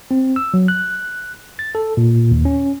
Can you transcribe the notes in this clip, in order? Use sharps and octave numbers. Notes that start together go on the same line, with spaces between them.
C4
E6
F#3
F#6
A6
A4
A#2
D#2
C#4